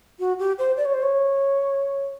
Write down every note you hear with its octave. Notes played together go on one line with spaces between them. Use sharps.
F#4
G4
C5
D5
C#5
C5
C#5